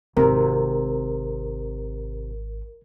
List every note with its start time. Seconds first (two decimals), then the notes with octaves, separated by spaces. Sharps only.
0.17 G#1 C3 A#4